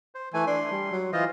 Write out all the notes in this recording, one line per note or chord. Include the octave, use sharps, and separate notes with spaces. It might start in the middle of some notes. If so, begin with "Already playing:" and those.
C5
E3 A3 G#5
D4 C6
G3
F#3
E3 F4 C5 D#5